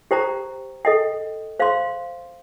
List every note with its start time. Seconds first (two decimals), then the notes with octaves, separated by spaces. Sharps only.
0.11 G4 C5 G5 A#5
0.85 A4 D#5 G5
1.60 C5 F5 C6